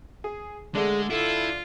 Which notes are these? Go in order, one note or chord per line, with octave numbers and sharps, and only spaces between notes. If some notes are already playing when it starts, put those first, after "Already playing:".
G#4
D3 G#3 A3 D4 G#4
E4 F4 A4